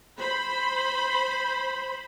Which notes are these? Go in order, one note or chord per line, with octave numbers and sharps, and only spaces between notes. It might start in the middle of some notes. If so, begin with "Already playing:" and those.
C5 B5